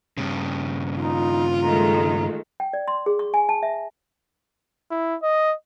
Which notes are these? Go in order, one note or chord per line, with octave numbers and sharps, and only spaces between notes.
G2 C#3
D#4 F4
D#3 G#3 A3 A#5
G5
D5
C6
G#4
C#6
G#5
A5
E5
E4
D#5